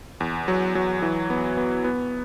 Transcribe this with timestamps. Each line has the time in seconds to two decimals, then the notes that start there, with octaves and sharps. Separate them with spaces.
0.20 E2
0.48 F#3
0.75 F#3
1.02 E3
1.30 B3
1.57 B3
1.84 B3